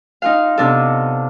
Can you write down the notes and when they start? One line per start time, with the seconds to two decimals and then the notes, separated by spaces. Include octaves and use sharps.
0.22 D#4 F4 F5
0.58 C3 B3 D4 D#4 A4